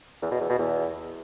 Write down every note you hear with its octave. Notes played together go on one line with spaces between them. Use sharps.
E2
B2
E2
B2
E2